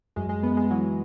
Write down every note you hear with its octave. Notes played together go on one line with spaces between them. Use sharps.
F#2 G#3
G#3
F#2 B3
G#3
E3 F#3